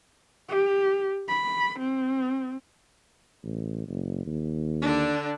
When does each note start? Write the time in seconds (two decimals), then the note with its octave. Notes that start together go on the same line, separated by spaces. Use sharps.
0.49 G4
1.28 B5
1.79 C4
3.43 A1
3.88 F#1
4.26 D#2
4.81 D3 D4